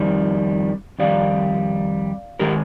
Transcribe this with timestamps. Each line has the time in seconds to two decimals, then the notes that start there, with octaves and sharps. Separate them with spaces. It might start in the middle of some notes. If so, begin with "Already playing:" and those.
Already playing: F2 D#3 G3
0.99 F2 D#3 G3 D5 F5
2.39 D#3 G#3 G4 A#4